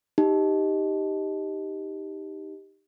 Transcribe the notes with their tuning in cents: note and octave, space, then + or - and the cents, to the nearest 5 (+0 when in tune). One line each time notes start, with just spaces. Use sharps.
D#4 +0 G4 +0 D#5 +0